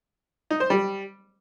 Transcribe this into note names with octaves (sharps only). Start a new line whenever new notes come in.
D#4
C5
G3